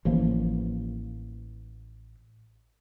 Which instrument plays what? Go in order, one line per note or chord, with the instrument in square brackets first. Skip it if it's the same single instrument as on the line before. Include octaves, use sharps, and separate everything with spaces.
[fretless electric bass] A1 E3 F3 A#3